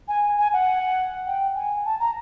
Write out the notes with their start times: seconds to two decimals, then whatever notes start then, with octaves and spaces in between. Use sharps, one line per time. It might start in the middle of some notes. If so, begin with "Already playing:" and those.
0.08 G#5
0.38 G#5
0.53 F#5
1.27 G5
1.56 G#5
1.85 A5
2.00 A#5